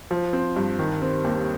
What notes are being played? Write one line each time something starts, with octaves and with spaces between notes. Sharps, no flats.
F3
C4
G2
D#3
C4
D#2